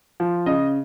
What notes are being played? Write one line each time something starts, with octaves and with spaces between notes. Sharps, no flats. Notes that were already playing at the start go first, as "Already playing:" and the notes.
F3
C#3 D#5